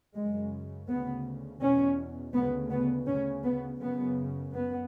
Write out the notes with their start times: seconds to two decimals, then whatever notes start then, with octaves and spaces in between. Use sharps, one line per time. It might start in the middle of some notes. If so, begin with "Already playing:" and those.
0.15 F#2 C#3 G#3
0.88 D2 C#3 B3
1.61 E2 B2 C#4
2.34 D2 C#3 B3
2.71 B3
3.07 D2 C#3 C#4
3.44 B3
3.81 F#2 C#3 B3
4.53 F#2 B3